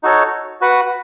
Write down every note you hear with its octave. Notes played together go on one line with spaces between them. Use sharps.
D#4 F#4 A4 C#5
F#4 B4 F#5